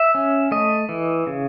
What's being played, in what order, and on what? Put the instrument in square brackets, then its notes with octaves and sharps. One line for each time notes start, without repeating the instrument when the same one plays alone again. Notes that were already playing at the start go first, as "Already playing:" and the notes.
Already playing: [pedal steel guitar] E5
C#4
A3 D#5
E3
C#3